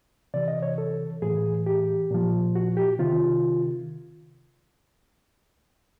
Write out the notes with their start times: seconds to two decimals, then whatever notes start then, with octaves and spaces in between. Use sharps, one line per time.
0.34 C3 E3 D5
0.48 D#5
0.63 C#5
0.78 A4
1.22 A2 E3 G#4
1.66 G4
2.11 A#2 F3
2.55 F#4
2.77 G4
2.99 C3 D#3 F4